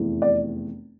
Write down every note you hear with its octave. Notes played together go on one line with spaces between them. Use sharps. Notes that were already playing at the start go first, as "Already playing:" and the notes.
Already playing: F1 E2 E3
D5